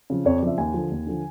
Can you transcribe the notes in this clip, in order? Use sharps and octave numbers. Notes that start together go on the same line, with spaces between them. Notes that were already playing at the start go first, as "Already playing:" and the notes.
C#3 F3
F2 C#5
D5
C#3 F3 E5
D#2 G#5
D3 F3
D#2
D3 F3